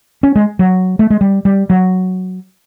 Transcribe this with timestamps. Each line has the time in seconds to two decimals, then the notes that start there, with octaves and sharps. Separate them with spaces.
0.23 C#4
0.36 G#3
0.59 F#3
0.99 A3
1.10 G#3
1.21 G3
1.45 G3
1.70 F#3